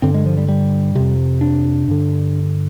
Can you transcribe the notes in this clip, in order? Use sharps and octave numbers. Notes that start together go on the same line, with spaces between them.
G2 D3 C4
G#3
F3
G3
G3
F2 C3
D4
G2 D3